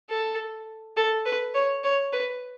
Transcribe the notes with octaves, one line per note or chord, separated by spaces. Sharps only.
A4
A4
B4
C#5
C#5
B4